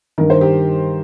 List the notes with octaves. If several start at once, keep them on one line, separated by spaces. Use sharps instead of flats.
G2 D#3 A#4
C5
G4 A#4